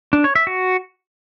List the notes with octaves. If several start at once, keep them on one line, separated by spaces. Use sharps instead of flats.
D4
C#5
E5
F#4